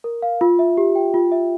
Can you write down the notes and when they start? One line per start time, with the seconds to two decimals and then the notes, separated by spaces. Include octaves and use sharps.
0.04 A#4
0.22 F5
0.41 F4
0.59 E5
0.78 G4
0.95 G5
1.14 F4
1.32 E5